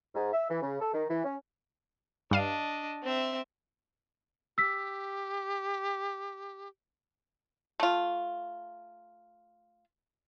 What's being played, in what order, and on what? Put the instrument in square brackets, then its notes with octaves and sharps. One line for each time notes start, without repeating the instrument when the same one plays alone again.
[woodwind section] G#2
E5
E3
C#3
A4
D#3
E3
C#4
[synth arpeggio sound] G2 F5 D#7 [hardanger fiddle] D4 D#5
[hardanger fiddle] C4 E5
[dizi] G4 [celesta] E6 B6
[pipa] A3 F4